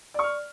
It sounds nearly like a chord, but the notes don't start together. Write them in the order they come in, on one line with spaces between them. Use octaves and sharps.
D5 C#6 F6